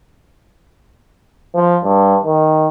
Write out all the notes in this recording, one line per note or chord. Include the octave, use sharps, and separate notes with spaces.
F3
G2
D#3